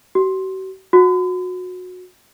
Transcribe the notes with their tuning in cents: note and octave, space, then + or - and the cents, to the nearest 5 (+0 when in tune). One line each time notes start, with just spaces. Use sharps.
F#4 +45
F#4 -25